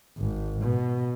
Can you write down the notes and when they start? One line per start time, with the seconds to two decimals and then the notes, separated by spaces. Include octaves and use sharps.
0.18 G#1
0.62 B2